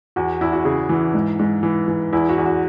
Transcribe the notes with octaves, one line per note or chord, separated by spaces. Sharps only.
E2 F#4
E2 E4
F#4
C#3 G#4
E3
G#2
G#2
E3
E3
E2 E4
F#4
E2
F#4